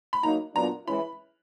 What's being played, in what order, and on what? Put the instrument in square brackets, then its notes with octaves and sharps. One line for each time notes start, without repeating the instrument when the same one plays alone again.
[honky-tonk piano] B5
[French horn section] F#3 A#3 D#4 [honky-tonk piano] A#5
[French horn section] A#2 F#3 B3 D4 [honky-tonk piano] A#5
[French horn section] E3 G#3 C#4 E4 [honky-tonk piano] B5